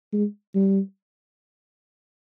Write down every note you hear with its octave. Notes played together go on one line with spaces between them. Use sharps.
G#3
G3